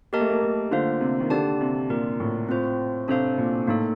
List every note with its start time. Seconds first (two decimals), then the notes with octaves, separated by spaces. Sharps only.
0.13 A#3 G4 A#4 D#5 A5
0.21 A3
0.30 A#3
0.42 A3
0.71 D3 A#3 F4 C5 F5
1.01 C3
1.20 D#3
1.30 D3 A#3 D4 G4 D5 A5
1.61 C3
1.90 A#2 F4 A#4 D5
2.20 A2
2.49 C4 F4 C5
3.08 C3 D4 A4 C5 F5
3.38 A#2
3.67 A2 A#3 D#4 A4